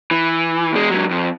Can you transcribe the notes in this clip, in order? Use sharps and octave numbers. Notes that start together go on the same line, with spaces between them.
E3
E2 G#3
G#2 F#3
F2